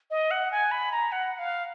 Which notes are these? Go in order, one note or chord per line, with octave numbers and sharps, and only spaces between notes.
D#5
F#5
G#5
B5
A#5
F#5
F5